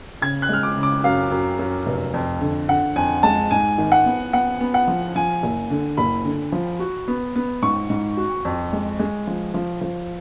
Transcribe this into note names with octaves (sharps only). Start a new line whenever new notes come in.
C#3 G#6
F#6
G#3 F6
D6
C#3
D6
F#2 F5
F#2
F#2
F1
F2
D3
D3 F#5
F2 G#5
G#3 A5
G#2 G#5
G#1
F#5
B3
B3 F#5
B3
F#5
F3
F3 G#5
F#1
D3
F#1 B5
D3
F3
F#4
B3
B3
G#2 C#6
G#2
F#4
F2
G#3
G#3
F3
F3
F3